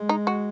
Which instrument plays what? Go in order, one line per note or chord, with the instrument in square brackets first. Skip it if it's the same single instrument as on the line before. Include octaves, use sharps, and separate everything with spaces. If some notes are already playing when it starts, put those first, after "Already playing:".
Already playing: [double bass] G#3
[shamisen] D#4
F#4